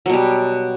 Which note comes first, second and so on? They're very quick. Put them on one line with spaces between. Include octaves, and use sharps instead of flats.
F#3 B2 G3